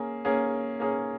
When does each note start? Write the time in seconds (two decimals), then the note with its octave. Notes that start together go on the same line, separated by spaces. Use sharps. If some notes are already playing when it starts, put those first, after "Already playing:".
Already playing: A#3 C#4 G#4
0.25 A#3 C#4 G#4
0.80 A#3 C#4 G#4